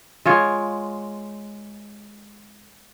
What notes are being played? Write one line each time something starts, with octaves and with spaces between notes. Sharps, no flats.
G#3 F4 C#5